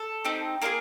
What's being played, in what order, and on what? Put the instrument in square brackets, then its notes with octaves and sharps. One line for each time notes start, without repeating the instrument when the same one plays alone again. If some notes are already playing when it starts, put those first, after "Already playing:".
Already playing: [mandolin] A4
C4 D#4 G4
A#3 D4 F4 G#4 A#4